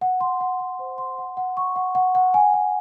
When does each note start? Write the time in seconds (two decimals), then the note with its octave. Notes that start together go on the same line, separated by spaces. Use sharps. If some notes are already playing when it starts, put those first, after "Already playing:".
0.01 F#5
0.21 C6
0.40 F#5
0.60 F#5
0.79 C5
0.98 C6
1.18 F#5
1.37 F#5
1.57 C#6
1.76 F#5
1.95 F#5
2.15 F#5
2.34 G#5
2.54 G#5